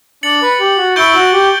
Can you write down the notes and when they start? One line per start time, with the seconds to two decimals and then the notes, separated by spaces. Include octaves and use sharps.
0.23 D4 A6 C#7 F#7
0.42 B4
0.60 G4
0.78 F#4
0.96 E4 C#6 G6 D7 G7
1.14 F#4
1.33 G4